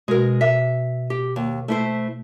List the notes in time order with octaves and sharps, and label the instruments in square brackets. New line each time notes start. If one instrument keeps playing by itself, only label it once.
[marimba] B2 F#4 [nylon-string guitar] G#3 A#4
[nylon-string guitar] E5
G4
D#2
A3 E4 C5